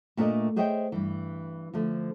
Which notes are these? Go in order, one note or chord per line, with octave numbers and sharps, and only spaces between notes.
A#2 A3 D4 G#4 A#4 D#5
G#4 C5 C#5 D#5 E5 G5
G2 E3
D3 F3 A3